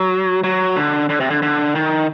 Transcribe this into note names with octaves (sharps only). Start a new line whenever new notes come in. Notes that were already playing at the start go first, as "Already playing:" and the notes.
Already playing: F#3
F#3
D3
D3
C3
D3
D3
D#3